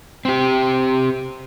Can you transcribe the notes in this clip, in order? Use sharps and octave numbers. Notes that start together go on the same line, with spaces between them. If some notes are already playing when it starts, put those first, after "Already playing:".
C4 G4